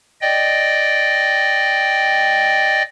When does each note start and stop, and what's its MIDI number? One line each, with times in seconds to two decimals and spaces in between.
0.21 2.82 74
0.21 2.82 75
0.21 2.82 79